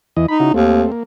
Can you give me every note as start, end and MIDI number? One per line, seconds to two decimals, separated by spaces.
0.17 0.26 40
0.17 0.26 52
0.17 0.26 75
0.28 0.53 63
0.28 0.38 83
0.40 0.52 49
0.40 0.52 64
0.40 0.52 66
0.54 0.85 39
0.54 0.91 57
0.54 0.91 60
0.92 1.03 58